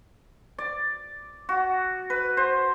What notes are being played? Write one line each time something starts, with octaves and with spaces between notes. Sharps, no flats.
D5
F#4
B4
C5